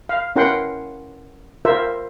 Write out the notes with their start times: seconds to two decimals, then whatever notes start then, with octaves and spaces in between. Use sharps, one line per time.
0.09 F5
0.36 C#4 E4 A#4 F#5 G5 C6
1.65 F4 A#4 C5 E5